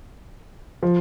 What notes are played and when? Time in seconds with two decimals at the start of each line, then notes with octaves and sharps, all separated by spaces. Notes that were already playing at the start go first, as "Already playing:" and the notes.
0.83 F3